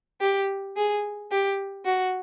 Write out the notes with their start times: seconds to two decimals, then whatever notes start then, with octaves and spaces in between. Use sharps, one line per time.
0.21 G4
0.76 G#4
1.31 G4
1.85 F#4